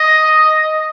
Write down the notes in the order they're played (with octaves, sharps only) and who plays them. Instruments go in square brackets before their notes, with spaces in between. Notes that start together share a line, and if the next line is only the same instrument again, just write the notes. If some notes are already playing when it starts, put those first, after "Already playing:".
Already playing: [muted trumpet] D#5